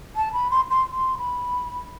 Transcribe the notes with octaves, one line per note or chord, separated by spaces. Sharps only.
A5
B5
C6
C6
C6
B5